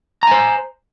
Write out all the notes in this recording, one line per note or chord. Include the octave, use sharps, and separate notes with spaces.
C5 G#5 A#5